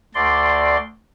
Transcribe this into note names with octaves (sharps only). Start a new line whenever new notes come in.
D2 D5 C6